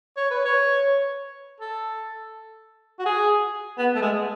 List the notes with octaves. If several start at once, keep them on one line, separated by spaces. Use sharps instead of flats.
C#5
B4
C#5
A4
F#4
G#4
B3
A3
G#3